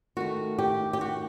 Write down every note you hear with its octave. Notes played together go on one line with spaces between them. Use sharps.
D#3 A3 F#4
G4
G4
F#4